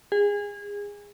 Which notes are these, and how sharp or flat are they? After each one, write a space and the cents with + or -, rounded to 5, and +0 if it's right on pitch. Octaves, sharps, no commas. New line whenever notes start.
G#4 -25